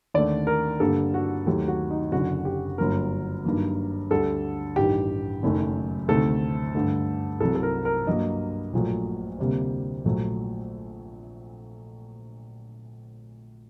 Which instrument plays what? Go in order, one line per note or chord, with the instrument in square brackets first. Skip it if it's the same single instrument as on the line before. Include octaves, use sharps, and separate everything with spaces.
[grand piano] D#2 D3 A3 D5
A#4
G2 D3 G3 A#3 A4
F#4
D#2 D#3 F#3 A3 G4
F#4
D#4
F#1 F#2 D3 F#4
G4
G1 G2 F#3 A#3 A#4
G2 D#3 F#3 A#3
D2 D3 G3 A4
A1 G2 D#3 G4
F#1 F#2 D#3 A3
D2 C3 D#3 A3 A4
G2 D3 A3
C2 C3 F#3 A4
A4
A#4
A#4
G2 F#3 A#3 D#5
A#1 A#2 F#3 A3
D2 C3 G3 A#3
A#1 A#2 F#3 A3